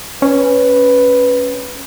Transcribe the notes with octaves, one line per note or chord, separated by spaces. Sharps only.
C#4 B4